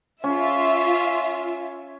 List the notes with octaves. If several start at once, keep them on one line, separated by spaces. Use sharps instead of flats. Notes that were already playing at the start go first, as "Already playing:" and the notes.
C#4 F4 E5